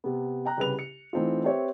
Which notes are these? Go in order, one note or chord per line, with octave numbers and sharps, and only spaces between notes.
C3 B3
G5 A#5 F#6
C2 C#3 G4 B4 F7
C#7
E3 A3 C4 D#4 F4
C4 G4 B4 C#5 E5